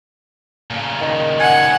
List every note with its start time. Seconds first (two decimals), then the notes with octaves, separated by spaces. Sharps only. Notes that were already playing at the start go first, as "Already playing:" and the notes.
0.71 A#2 C#3
1.00 D#3
1.40 F#5 G#5